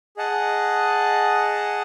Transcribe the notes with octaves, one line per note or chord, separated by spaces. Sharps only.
G#4 D#5 F#5 A5